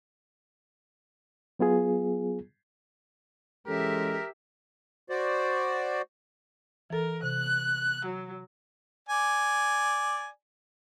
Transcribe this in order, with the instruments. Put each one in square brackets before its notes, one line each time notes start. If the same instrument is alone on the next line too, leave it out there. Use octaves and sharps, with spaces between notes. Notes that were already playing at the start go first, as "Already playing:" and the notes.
[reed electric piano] F#3 B3 F4 G#4
[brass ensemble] E3 G#3 C#4 [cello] G4 E5 [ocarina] A4 [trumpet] A#4
[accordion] F#4 C5 D5
[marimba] E3 A4 [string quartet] A#4
[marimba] C3 [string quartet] F#6
[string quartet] F#3
[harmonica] D5 G#5